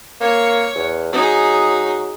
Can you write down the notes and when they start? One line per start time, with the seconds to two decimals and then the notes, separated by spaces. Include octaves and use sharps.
0.21 A#3 C#5
0.75 E2
1.13 F#3 D#4 G#4